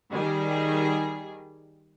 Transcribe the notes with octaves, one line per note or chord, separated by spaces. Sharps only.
D#3 G3 G#4